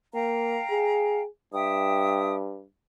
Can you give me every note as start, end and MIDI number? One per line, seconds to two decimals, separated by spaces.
0.14 0.60 58
0.14 1.21 77
0.14 1.21 79
0.14 1.21 82
0.71 1.27 68
1.53 2.65 43
1.53 2.35 76
1.53 2.35 79
1.53 2.35 87